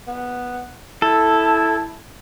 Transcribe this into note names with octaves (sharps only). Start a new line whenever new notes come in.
B3
E4 A4